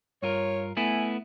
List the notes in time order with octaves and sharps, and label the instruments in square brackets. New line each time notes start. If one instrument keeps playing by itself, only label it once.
[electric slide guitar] G2 F4 A#4 [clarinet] C#5
[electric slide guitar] A3 B3 E4 [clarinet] G#5